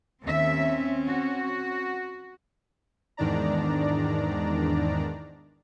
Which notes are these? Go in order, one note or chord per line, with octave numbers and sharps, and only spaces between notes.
D#2 C4 C#4 E5
F#4
E2 G#2 D#3 D4 D5 A#5